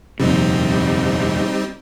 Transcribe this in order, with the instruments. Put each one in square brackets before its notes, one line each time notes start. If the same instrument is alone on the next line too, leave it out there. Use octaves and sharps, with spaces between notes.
[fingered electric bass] D#1 F2 C3 [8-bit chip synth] G3 C4 D#4